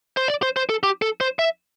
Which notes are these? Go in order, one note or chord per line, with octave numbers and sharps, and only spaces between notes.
C5
D5
C5
C5
A4
G4
A4
C5
E5